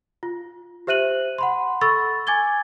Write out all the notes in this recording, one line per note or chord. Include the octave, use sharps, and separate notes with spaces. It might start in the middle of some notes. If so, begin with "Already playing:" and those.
F4
G4 C5 E5 F#6 D#7 F#7
F#5 B5 C6
A4 B5 C#6 E6 A6
G#5 D6 G#6 A6 G7